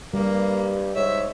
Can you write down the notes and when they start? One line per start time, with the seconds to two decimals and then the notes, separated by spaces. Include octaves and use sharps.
0.14 G2 G3 A#3
0.95 G#2 C#5 E5